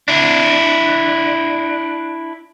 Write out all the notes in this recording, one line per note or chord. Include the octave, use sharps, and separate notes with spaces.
D4 E4